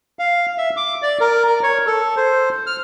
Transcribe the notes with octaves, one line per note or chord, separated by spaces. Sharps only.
F5
E5
D6
D5
A#4
A#4
C#5
A4
C5
F6